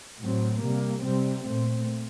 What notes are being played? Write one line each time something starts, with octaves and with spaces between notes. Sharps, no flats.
A2 F#3 C4
C3 G3 A#3
C3 G3 C4
A#2 A3 C4